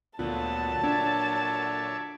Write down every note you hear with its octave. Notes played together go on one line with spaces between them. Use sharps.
D2 A#2 D3 F#3 B3 F4 A5
D4 C#5 D5 E5